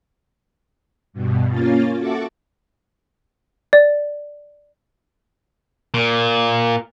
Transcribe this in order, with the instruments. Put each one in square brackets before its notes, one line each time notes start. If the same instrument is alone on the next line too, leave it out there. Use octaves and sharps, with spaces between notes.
[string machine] G2 B2
A#3 C#4 F4 A6
F#4 A4 E5 F#5 C#6 D6
[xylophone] D5
[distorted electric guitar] A#2